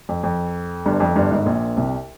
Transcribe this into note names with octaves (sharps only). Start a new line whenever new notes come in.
F2
F2
G1 G2
F2
G1 G2
G#1 G#2
A#1 A#2
C2 C3